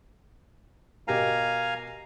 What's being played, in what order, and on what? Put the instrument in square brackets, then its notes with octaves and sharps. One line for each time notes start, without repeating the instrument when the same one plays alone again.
[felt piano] B2 G4 A#4 [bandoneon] F5 G#5 A#5